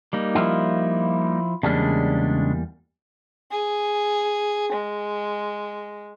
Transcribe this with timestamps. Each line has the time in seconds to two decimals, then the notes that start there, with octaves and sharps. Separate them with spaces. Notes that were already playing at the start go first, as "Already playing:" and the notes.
0.13 G3 A#3 D#4
0.35 F3 E4 F4
1.63 E2 C#3 G3 G#3 A#3 D4
3.51 G#4
4.73 G#3